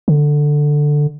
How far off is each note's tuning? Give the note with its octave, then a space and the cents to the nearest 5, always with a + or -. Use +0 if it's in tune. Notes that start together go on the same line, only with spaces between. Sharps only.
D3 +5